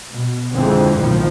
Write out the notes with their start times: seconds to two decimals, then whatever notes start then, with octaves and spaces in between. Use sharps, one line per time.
0.14 B2
0.54 F2 D3 E3 G#3 C4
0.96 B1 A2 D#3 F3